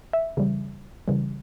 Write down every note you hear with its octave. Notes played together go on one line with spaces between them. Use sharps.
E5
C#3 E3 G3
C#3 E3 G3